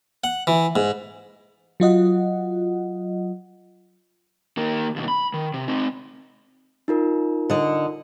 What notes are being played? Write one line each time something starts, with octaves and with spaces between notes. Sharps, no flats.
F#5
E3
G#2
F#3 F4 D#5 F#5
D#3 A#3
D#2 B2
B5
D#3
C3
C4 D#4
D#4 F4 A#4
D3 D#5